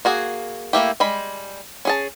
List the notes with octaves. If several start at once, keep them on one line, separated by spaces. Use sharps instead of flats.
A#3 F#4 G#4
A3 A#3 E4 G4
G3 G#3 B5
C#4 G#4 A5